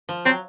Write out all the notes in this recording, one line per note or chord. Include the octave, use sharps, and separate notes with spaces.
F3
F#3 C4